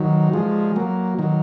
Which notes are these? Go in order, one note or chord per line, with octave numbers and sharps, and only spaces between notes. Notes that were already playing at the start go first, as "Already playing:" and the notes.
Already playing: D#3 F#3
F3 G#3
F#3 A#3
D#3 F#3